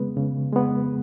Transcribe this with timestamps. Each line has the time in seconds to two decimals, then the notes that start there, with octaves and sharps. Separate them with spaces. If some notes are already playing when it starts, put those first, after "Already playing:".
Already playing: C#3 G#3 B3 B4
0.17 C#3
0.53 G#3 B3